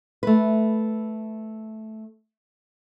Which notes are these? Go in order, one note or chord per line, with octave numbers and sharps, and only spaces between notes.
A3 B4